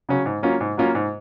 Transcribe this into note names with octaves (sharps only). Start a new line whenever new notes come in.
C#3 F#3 C#4
G#2
F#3 A#3 C#4 F4
G#2
F#3 A#3 C#4 F4
G#2